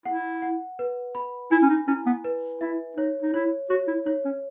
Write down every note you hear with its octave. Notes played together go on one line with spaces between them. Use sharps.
E4 F#5
F#5
B4
B5
E4 G#5
C#4
D#4
C#4 E4
B3
B4
E4 E5
D#4 C#5
D#4
E4 C#5
F#4 C#5
E4
D#4 C#5
C#4